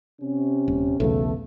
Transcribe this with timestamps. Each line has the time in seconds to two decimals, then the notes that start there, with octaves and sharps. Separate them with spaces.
0.21 C3 C#4
0.68 D#1
1.00 B1 E2 C#3 A3 B3 A4